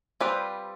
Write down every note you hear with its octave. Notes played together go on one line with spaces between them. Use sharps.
G3 C4 F4 B4 D5